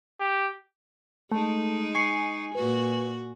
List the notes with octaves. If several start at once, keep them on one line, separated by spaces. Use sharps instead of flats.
G4
G#3 A3 D#4
G#5 C#6 C7 C#7
A#2 F#4 B4